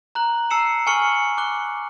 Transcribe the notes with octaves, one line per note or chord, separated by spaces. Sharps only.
A#5 F#6 F#7
A5 A#5 E6 C7 C#7 E7
G#5 A5 C#6 F6 C#7 F#7
D6 F#6 G7